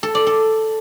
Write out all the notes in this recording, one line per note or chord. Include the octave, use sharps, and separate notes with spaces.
A4
D5
A4